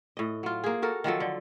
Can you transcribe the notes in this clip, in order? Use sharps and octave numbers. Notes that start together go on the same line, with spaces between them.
A2 D#5
F#3 F4
A#3 G#4
F#4 A4 A#4
D#3 F3 F#3 A4
D3